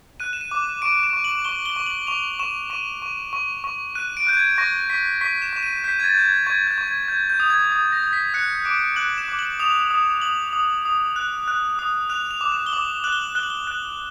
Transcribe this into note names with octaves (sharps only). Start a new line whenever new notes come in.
F#6 D#7
E7
D#7
D6
C#6 D7
E7
C#6
F#7
C#6 G7
G7
C#6
F#7
C#6 F7
C#6 E7
C#6 D#7
C#6
C#6
C#6
F#6 D#7
D7
F#6 G6
G#6
C#6 A#6
C#6 B6
C#6 B6
E7
C#6 E7
D#7
G6 B6
G#6
A6
G6
G#6
C#6 G#6
G6
C#6
G#6
G6 G#6
G6
D#6
G#6
D#6
A#6
D#6
B6
F#6 C#7
D6 D7
F#6 F#7
E7
D6
F#7
D#6 F7
D#6
D#6 F#7
D#6
D#6
F#6
F#6
D#6
F#6 F7
F7
D6
E7
G7
D6 F#7
F#6 F#7
G7
F#7
F#6 G7
F#7
G7
F#6